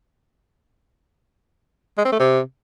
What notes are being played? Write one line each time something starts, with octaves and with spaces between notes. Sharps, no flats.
G#3
C4
A3
C3